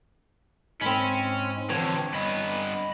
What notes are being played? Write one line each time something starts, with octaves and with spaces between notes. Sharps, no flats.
G#2 G#3 C4 C#4 B5
D3 E3 F3 C4 C#5
G2 B3 D#5 B5